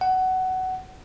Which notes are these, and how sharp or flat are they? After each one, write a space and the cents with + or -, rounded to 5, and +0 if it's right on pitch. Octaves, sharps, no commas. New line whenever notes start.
F#5 +15